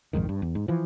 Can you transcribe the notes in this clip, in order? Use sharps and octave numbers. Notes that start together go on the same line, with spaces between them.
A#1 F2 G#2 D#3
G2
E2
G#2
E3 F3